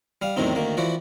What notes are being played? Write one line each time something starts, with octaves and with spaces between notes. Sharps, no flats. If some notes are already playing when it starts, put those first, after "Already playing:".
G3 F5
E2 A2 D#3 F#3 C4 D#4
D2 D#3 A#3
E3 F3 F#4 D5